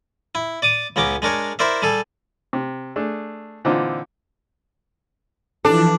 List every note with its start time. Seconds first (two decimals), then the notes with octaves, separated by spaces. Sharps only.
0.35 E4
0.62 D5 D6 D#6
0.96 C#2 B3 C#4 A#5 D6
1.22 G#3 D4 A#4 C#5
1.59 E4 A#4 C5 D5 E5
1.82 G3 G#4 A4
2.53 C3
2.96 A3 D4 G#4
3.65 A#2 D3 E3 C4 D#4 F4
5.65 E3 F3 D4 A4